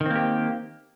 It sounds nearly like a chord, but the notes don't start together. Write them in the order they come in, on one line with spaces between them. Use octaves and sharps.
D#3 C4 A#3 G4